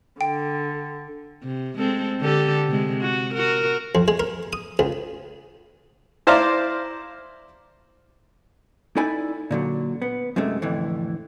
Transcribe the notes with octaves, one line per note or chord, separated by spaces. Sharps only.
D3 G5
C3
G#3 C4 A4
D3 G4 A4
C3 G#3
F#4
F#4 A#4
F2
G#3
A#4
D#6
C#2
E4 C5 D5 F5 A#5
D#4 E4 A4 D5 G#5 B5
A#2 D3 F#3
B3
F#2 C3 G#3 A3
F2 A2 D3 E3